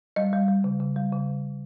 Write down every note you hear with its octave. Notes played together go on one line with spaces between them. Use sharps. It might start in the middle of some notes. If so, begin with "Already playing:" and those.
G3 D#5
G3
G3
C#3
C#3
G3
C#3